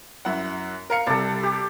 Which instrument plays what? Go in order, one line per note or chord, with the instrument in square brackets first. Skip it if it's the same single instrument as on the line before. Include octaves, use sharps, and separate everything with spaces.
[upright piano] F#2 E4 F#5
A#4 F5 C#7
[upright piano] C2 C3 [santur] A4 D5
[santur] G4